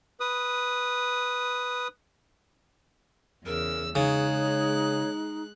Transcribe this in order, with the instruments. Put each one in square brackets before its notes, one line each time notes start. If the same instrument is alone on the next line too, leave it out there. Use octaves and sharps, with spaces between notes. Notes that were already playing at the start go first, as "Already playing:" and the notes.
[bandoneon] B4 D#6
[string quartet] E2 C#3 E6 [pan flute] A#4
[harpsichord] C#3 [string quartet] G#3 F#6 [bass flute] D#4 [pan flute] C#5